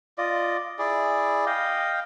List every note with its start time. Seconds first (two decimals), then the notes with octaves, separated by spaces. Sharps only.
0.18 F4 D5 D#5
0.79 E4 G#4 D5
1.46 D#5 F5 G5